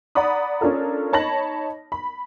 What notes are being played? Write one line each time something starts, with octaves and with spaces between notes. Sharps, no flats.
D5 F#5 A#5 B5 D#6
C#4 D4 F4 A4 A#4
D#4 C#5 A5 B5 A#6 F#7
B5